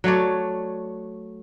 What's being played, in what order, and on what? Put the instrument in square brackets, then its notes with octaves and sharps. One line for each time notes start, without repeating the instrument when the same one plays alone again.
[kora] F#3 A3 C#5 D5